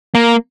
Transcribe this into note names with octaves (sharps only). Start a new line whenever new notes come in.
A#3